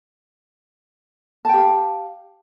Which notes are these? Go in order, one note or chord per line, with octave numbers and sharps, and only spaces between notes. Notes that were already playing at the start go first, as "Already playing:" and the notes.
G4 F5 G5 A5